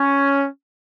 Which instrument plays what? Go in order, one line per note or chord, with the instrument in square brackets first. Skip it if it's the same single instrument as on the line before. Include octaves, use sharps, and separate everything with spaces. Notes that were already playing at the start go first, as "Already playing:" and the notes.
Already playing: [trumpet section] C#4